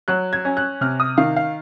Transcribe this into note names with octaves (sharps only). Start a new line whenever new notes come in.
F#3 F#6
G#6
C#4
F#6
C3 F6
D#6
D#3 F5
F5